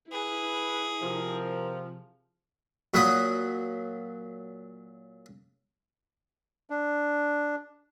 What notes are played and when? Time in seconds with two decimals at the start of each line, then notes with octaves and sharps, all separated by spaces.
0.12 E4 G#4 B4
1.02 C3 F3 A#4
2.94 A#2 F#3 B4 D#6
6.70 D4